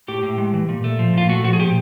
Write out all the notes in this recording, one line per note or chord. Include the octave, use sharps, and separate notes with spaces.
A2 G4
A2
G#3
E3
A#2
A3
F3
A#2 F4
A3 F#4
F3 F#4
G#4
A#2 G4